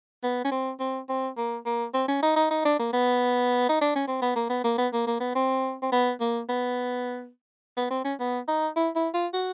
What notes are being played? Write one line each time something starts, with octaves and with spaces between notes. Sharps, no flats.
B3
C#4
C4
C4
C4
A#3
A#3
C4
C#4
D#4
D#4
D#4
D4
A#3
B3
D#4
D4
C#4
C4
B3
A#3
B3
A#3
B3
A#3
A#3
B3
C4
C4
B3
A#3
B3
B3
C4
C#4
B3
D#4
E4
E4
F4
F#4